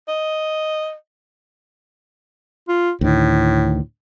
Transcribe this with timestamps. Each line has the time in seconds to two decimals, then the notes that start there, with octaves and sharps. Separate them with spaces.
0.08 D#5
2.68 F4
3.01 D2 A2 D#3